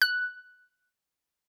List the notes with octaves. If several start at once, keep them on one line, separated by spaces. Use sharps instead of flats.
F#6